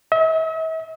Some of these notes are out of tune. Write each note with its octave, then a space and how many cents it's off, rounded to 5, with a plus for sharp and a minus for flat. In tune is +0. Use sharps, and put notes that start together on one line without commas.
E5 -45